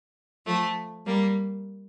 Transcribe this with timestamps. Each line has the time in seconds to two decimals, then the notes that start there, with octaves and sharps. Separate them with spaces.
0.46 F3 A3
1.06 G3 A#3